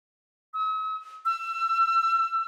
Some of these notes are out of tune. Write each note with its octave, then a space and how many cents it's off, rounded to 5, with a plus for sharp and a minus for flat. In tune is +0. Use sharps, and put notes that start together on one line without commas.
E6 -45
E6 +25